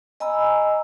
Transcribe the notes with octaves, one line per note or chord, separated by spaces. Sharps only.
D#5 G#5 A#5 B5 E6